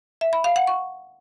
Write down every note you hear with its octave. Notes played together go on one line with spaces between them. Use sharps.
E5
B5
F5
F#5
C#6